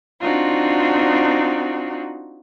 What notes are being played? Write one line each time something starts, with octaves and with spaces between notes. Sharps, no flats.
C4 D4 D#4 F4 F#4